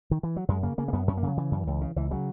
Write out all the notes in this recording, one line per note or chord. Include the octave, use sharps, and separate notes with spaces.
D#3
E3
F#3
F#2 G#3
C#3 A#3
C#3 A#3
A#3
F#2 B3
F#2 C#4
A#3
C#3 F#3
C#3 E3
F#2
C#2
C#3
C#2 E3
C#3 F#3